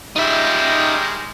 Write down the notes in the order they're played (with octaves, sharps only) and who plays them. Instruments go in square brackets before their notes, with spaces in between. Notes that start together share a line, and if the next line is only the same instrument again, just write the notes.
[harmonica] D#3 G3 G#3 [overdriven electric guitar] D#4 E5